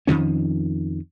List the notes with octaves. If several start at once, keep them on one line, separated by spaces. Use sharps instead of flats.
F2 D#3 F3 C#4